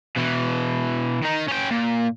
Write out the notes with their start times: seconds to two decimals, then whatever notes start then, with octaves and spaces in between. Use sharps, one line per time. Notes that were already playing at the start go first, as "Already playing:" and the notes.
0.16 B2 E3
1.23 D#3 D#4
1.48 C#4 G5
1.71 A#2